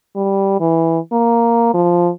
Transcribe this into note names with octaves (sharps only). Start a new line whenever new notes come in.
G3
E3
A#3
F3